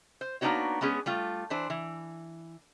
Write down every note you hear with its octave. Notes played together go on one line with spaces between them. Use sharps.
C5
A#3 B3 D4 D#4 F#4 C#5
G#3 B3 C#4 G#4
G3 A3 F4
E3 D4 C5
E3